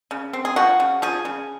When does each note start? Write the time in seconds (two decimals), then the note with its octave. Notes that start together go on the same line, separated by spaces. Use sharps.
0.11 C#3
0.33 C4
0.45 G#4
0.56 F3 F#4
0.80 C#3
1.02 F3 G#4
1.25 C#3